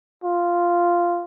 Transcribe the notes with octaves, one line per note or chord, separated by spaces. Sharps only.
F4